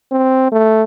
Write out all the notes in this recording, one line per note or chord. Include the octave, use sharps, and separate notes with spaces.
C4
A3